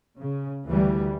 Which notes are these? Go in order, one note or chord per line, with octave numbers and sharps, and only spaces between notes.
C#3
D2 E3 G3